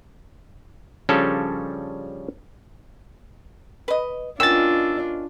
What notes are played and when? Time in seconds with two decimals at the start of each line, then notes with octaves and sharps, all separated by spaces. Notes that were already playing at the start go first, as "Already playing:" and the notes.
1.09 C#3 F3 G3 C#4 D4 A4
3.88 B4 D#5
4.40 B2 D#3 C#4 D4 F4 E6 A6